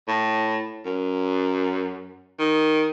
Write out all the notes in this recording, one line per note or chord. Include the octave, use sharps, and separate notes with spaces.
A2
F#2
D#3